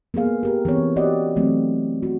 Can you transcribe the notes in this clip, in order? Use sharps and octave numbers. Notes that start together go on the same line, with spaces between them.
A#3 B3 G#4 F5
G4 A#4
E3 B3 C4 C#5
F#4 G4 D5 D#5 F#5
E3 F#3 A3 C4
F#4